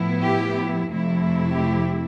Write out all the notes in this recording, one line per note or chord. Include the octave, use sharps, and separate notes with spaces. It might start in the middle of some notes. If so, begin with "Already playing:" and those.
Already playing: A2 F3 B3 E4
G4
F2 C3 F3 A3 E4
G4